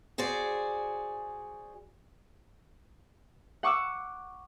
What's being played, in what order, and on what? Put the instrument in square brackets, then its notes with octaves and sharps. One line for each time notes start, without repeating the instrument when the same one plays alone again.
[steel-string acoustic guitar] F#4 G#4 C5 D5
[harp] F#5 C#6 D6 E6